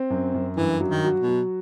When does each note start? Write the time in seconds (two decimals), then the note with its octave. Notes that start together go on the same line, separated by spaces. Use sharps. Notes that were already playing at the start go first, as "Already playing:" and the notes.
Already playing: C4
0.10 F#2
0.34 F#2
0.57 G2 E3
0.80 F#3
0.88 D#3
1.05 F#4
1.20 B2
1.27 F#3